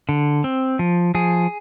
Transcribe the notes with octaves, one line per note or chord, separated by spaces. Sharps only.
D3
C4
F3
F3 G#4